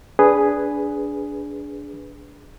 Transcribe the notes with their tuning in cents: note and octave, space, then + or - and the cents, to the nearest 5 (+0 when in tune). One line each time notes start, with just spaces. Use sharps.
D4 -20 G#4 +0 B4 +0